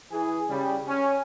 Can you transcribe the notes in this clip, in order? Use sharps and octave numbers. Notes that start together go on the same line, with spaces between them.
E3 G#4
C#3 G3
C#4